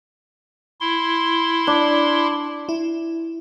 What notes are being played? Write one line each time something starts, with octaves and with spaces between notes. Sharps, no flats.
E4 C6
D4
E4